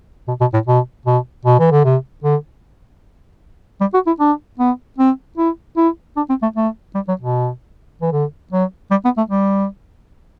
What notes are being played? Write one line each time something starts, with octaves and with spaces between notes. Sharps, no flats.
B2
B2
A2
B2
B2
B2
E3
D3
C3
D3
G3
F#4
E4
D4
B3
C4
E4
E4
D4
C4
A3
A3
G3
F#3
B2
E3
D3
F#3
G3
B3
A3
G3